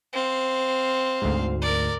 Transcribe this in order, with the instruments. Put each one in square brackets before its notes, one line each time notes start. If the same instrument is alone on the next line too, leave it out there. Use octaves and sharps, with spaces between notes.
[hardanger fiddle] C4 F5
[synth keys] D2 G#2
[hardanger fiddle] A#4 D5